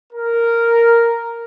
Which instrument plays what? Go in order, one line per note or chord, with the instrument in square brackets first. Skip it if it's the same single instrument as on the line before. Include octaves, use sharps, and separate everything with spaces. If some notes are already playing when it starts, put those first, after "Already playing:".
[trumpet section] A#4